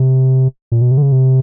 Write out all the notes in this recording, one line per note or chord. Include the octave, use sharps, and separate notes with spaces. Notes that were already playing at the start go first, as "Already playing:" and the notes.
Already playing: C3
A#2
B2
C3
D3
C#3
C3